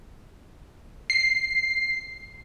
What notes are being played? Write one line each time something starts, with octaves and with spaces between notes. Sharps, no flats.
C7